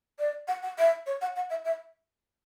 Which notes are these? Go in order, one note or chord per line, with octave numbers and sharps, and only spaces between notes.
D5
F#5
F#5
E5
C#5
F#5
F#5
E5
E5